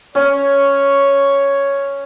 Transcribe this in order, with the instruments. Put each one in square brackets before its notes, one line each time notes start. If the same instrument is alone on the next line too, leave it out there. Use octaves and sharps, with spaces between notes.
[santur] C#4 [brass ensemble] C#5